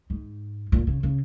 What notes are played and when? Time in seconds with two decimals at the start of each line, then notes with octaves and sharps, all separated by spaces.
0.10 G#2
0.72 A#2
0.87 C#3
1.03 C#3